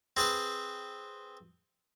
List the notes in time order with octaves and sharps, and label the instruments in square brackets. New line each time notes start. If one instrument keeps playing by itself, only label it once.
[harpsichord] C4 G#4 B4 G#5